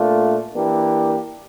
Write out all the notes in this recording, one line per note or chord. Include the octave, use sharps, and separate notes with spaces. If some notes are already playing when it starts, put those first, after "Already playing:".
Already playing: A#2 A3 D4 F4
E3 A#3 D4 G4